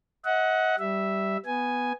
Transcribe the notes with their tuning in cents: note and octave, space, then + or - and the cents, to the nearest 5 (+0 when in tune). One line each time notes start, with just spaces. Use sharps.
D#5 +40 F#5 +0
G3 -15 E5 +0
B3 +0 G#5 +0